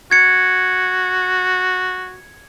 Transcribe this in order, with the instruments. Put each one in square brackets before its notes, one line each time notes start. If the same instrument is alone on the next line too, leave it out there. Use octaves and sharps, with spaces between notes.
[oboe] F#4 [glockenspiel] G#6 C#7